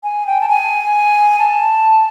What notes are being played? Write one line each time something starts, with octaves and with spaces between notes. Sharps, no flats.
G#5
G5
A5
G#5
A5